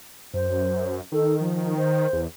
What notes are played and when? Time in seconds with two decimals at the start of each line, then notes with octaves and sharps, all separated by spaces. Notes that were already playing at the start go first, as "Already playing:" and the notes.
0.34 F#2 C5
1.12 D#3 A4
1.39 F3
1.77 C5
2.13 E2